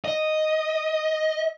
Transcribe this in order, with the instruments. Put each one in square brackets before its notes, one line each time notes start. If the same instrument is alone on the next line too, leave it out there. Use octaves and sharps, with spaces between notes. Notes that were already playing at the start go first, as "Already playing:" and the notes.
[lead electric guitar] D#5